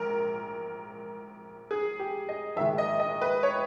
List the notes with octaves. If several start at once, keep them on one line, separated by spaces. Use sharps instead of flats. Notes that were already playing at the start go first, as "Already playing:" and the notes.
Already playing: A#1 G#2 A#4
G#4
G4
D#5
A#1 G#2 D#3 G#3 E5
D#5
D#5
B4
C#5